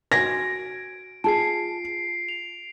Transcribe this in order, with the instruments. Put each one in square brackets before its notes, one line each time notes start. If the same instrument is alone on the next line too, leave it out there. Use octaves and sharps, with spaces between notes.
[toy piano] F#4 G#5 [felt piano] G#6 A#6 [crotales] D7
[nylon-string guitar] F4 G#4 [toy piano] A5 [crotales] C7 D7
[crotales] F7